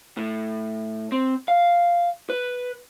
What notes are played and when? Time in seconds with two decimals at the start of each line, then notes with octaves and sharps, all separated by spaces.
0.17 A2
1.12 C4
1.48 F5
2.30 B4